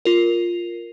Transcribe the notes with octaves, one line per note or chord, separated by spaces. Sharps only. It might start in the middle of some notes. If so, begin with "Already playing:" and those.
F4 A#4